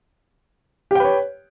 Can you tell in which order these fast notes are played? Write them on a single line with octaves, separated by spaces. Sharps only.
G4 G5 B4 C#5